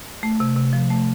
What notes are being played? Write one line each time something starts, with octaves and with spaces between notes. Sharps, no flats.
A3
C3
C3
F3
A3